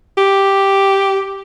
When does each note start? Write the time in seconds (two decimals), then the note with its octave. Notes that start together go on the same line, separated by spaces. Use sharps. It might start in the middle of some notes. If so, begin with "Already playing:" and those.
0.18 G4